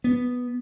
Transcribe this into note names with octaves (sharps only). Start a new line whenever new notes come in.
B3